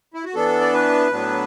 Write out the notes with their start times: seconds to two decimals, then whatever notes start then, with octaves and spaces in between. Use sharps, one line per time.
0.14 E4
0.24 F#4
0.35 E3 B3 D4 A4
0.61 D5
0.73 B4
1.11 A2 F#3 B3 D4